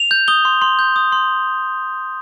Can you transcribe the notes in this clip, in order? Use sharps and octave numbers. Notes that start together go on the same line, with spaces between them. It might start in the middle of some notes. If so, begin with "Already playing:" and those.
Already playing: F7
G6
D#6 G7
C6
C6
G6
D#6
C6